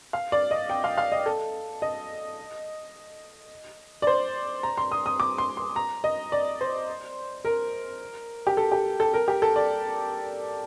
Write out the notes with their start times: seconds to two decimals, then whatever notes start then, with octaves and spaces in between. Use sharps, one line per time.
0.13 F5
0.32 D5
0.51 D#5
0.70 G5
0.84 F5
0.98 F5
1.12 D#5
1.26 A4
1.82 D#5
4.02 D5
4.07 C5
4.63 A#5
4.78 C6
4.91 D#6
5.06 D#6
5.20 D6
5.38 C6
5.57 C6
5.76 A#5
6.04 D#5
6.32 D5
6.61 C5
7.45 A#4
8.47 G4
8.57 A4
8.72 G4
9.00 A4
9.14 A#4
9.28 G4
9.42 A4
9.56 D5